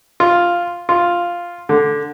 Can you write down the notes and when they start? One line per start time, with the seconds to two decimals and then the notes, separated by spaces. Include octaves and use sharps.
0.20 F4
0.89 F4
1.69 D3